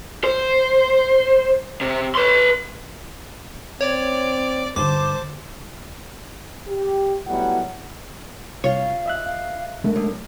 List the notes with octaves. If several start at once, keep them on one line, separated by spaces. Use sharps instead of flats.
C5
C3
B4 C6
C4 C#5 D5
G2 D3 C5 A5 D6
G4
F#3 G3 A3 B3 E4 F#5
C2 F4 C#5 F5
D#5 E5 F#6
F5
G#3 A3 D4 A#4
B1